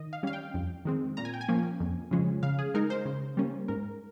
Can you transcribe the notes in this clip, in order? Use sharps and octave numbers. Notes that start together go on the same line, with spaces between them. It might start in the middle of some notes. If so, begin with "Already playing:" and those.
Already playing: D#3 D#5
F5
G3 C#4 F5
G5
F2
D#3 G#3 C4
A#2 A#5
G#5
G5
G#5
F3 A#3 C#4
F2
C#3 F3 G#3 C#4
C#3 F5
G#4
G#3 D#4 A#4
C5
C#3
G3 A#3 C#4
G#2 A#4